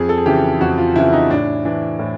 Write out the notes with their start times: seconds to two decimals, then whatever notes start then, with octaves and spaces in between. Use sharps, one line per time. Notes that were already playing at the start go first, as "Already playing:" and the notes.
Already playing: F2 G#4
0.09 A4
0.18 G#4
0.26 C#3 E3 G4
0.61 F2 F#4
0.78 F4
0.96 C#3 E3 E4
1.13 D#4
1.30 A2 D4
1.65 E3 D4
1.99 A2